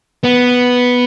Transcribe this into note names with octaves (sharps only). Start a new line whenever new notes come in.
B3